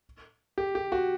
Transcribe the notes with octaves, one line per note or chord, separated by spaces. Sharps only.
G4
G4
F#4